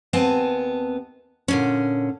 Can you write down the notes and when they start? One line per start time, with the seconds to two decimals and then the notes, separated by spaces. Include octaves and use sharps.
0.13 D#2 B3 C4 G#5 A5
1.48 A#2 D3 C#4